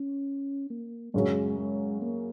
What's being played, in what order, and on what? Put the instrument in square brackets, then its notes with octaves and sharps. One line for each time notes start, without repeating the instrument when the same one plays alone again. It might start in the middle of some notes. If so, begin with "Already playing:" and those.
Already playing: [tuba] C#4
A#3
[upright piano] F#2 C#3 F#3 [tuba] G#3
[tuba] G#3
A#3